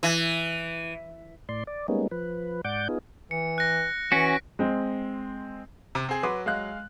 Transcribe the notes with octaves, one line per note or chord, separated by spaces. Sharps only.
E3
A2 D5 C6
D5
G3 G#3 A#3 B3 C#4 D#4
F3 B4
G#2 D5 F#5 D6 G6
B3 D#4 F4 G#4
E3 C#7
F#6 A#6
E3 C#4 F#4 B6 D7
G#3 C4
C3
C4 G#4
F#3 B4 C6 D6
G#3 F5 F#6